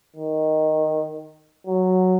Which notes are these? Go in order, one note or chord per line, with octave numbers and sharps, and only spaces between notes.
D#3
F#3